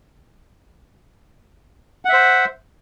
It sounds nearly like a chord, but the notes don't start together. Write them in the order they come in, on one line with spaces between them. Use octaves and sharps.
F#5 E5 C5